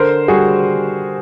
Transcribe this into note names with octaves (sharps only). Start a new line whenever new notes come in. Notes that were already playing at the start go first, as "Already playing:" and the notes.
Already playing: D3 A#4 C5
G3 F#4 G#4